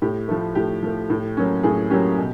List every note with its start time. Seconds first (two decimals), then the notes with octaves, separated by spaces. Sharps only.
0.02 A2 G4
0.28 F3 A3
0.55 A2 G4
0.83 F3 A3
1.10 A2
1.37 F#3 A#3 C#4
1.63 A2 G#4
1.90 F#3 A#3 C#4 G4
2.18 B2